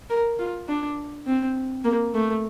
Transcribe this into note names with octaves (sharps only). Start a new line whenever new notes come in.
A#4
F4
D4
C4
A#3
A3